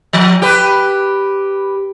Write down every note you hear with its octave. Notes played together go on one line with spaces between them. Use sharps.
F3
G4 B4